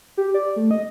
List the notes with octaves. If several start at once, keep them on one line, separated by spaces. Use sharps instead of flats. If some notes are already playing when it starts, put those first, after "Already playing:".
G4
D5
A3
D#5